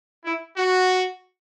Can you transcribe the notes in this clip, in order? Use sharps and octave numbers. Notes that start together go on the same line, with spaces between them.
E4
F#4